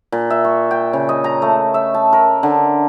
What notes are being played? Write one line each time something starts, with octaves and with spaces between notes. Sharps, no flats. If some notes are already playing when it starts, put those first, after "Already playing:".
A#2
E5
C#6
G5
C#3
D#5
A#5
A3
E5
A5
A#4
D3